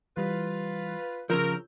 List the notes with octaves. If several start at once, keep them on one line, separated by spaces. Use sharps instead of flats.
E3 G3 F4 B4
C#3 F3 A#4 E6 G6